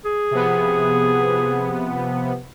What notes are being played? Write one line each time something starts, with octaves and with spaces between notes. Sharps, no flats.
G#4
C3 F3 B3